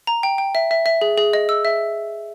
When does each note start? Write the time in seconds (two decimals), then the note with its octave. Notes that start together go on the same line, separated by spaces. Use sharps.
0.07 A#5
0.23 G5
0.38 G5
0.55 E5
0.71 E5
0.86 E5
1.01 G#4
1.18 G#4
1.33 D#5
1.49 E6
1.65 E5